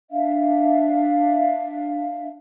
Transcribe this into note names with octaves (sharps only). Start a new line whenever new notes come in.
D4 E5 F5